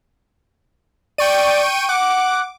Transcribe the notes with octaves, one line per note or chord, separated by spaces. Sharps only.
D5 G5 C#6 D#7
F#5 D6